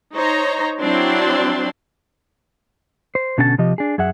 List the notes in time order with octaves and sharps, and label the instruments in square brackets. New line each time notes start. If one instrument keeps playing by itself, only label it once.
[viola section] D#4 C5 C#5 A#5
F#3 C4 D4 E4 C6
[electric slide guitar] C5
B2 D3 C#4 A4 C5 A5
C3 F3 G4 D#5
D4 G#4
F#2 G#4 E5 F#5